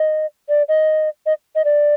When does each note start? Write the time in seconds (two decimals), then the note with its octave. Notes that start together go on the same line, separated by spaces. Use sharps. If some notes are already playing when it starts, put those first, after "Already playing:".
Already playing: D#5
0.49 D5
0.68 D#5
1.26 D#5
1.55 D#5
1.65 D5